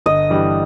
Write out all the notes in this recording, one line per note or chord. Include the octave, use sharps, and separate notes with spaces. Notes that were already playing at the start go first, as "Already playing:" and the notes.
G1 D#5
G2 E3 G3